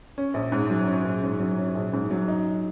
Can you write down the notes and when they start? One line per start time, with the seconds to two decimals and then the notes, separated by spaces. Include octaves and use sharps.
0.18 C#4
0.34 A#1
0.52 G#2
0.70 F#3
0.88 C#4
1.05 A#1
1.23 G#2
1.40 F#3
1.58 C#4
1.75 A#1
1.93 G#2
2.11 F#3
2.28 D#4